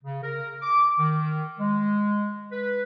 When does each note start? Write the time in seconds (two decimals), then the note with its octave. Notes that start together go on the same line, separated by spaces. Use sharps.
0.03 C#3
0.23 A#4
0.62 D6
0.99 D#3
1.59 G#3
2.52 B4